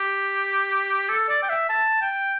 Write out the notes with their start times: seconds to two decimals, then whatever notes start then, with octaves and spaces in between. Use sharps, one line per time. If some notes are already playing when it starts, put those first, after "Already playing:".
Already playing: G4
1.09 A4
1.29 D5
1.43 G5
1.49 E5
1.69 A5
2.01 G5